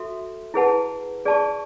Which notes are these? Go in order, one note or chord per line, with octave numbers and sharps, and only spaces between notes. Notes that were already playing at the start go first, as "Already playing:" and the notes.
Already playing: F#4 A4 E5
E4 G#4 B4 F#5 A5
G#4 D5 A5 C#6